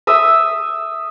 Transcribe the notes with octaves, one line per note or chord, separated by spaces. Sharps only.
E5 D#6 E6